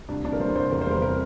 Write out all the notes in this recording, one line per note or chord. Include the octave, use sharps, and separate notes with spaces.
C2 D4
C2 D4
A#4
G3 C5
C2 C5
E2 A#4
C5
G3 A#4
C3 A#4